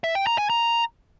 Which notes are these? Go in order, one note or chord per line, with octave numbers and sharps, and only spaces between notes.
E5
G5
A#5
G#5
A#5